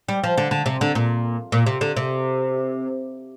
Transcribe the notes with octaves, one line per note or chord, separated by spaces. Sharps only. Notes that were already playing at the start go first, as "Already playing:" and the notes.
G3
F3
D3
D3
C3
D3
A#2
A#2
C3
D3
C3